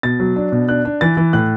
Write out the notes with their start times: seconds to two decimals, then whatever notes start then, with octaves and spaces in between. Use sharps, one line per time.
0.03 B2 A6
0.20 F#3
0.36 D4
0.52 B2
0.69 D4 F#6
0.85 D4
1.01 E3 A6
1.17 E3
1.33 A2 F#6